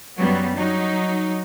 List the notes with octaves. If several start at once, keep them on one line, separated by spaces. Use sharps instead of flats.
F#2 F#3 G3 B3
F#3 D#4